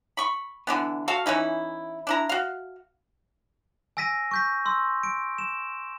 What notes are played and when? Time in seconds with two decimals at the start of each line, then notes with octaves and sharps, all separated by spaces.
0.17 B5 C#6
0.67 D3 E3 B3
1.08 F#4 A4 F5
1.26 E3 C#4 D#4 E4
2.07 D4 E4 A#5
2.29 F#4 F5
3.97 G#5 E6 A#6 B6 D#7
4.31 C#6 G6 B6
4.66 C6 E6
5.03 D7
5.38 E7